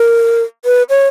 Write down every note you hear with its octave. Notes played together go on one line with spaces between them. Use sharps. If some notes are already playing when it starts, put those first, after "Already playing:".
Already playing: A#4
B4
C#5